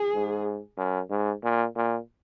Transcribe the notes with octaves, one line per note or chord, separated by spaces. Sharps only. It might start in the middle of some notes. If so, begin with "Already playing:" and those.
Already playing: G#4
G#2
F#2
G#2
A#2
A#2